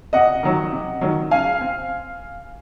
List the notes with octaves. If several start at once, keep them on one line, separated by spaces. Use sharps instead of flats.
C3 D#5 F#5
D#3 F#3
C3
D#3 F#3
C#3 F5 G#5
C4